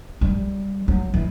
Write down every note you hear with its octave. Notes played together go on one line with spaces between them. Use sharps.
G3
F#3
E3